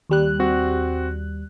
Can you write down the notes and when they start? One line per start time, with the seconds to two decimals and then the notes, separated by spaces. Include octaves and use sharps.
0.10 D#2 G3 F#6
0.39 C4 F#4